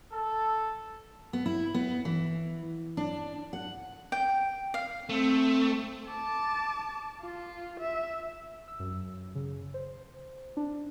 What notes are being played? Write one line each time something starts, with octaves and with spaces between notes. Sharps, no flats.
A4
B3
E4
B3
E3
D4
F#5
G5
F5
A3 C4
A5 D6
F4
E5
E6
F#2
C#3
C5
D4